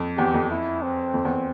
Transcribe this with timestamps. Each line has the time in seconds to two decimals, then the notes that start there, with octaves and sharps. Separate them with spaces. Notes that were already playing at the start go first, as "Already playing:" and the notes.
Already playing: F2
0.18 E2 G4
0.34 F2
0.50 E4
0.82 C4
1.14 F2
1.25 E2